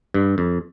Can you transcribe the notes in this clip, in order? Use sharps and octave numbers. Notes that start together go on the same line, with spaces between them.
G2
F2